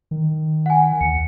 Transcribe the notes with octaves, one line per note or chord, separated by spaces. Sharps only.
D#3
F#5 G#5
D#2 C#7